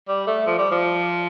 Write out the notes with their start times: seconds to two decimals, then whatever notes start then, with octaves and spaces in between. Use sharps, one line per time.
0.08 G3
0.27 A3
0.47 F3
0.59 G3
0.71 F3